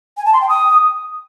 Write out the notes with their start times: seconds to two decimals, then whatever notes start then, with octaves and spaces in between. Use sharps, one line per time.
0.18 G#5
0.25 A5
0.33 C6
0.41 G5
0.49 D#6